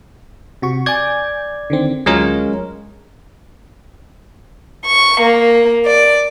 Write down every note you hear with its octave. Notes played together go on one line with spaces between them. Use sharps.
C3 F#4 C#6
D5 G#5 D6 G6 G#6
D3 D#3 C4
D2 F#3 G#3 C#4 F4 A#4
C#6
A#3
D5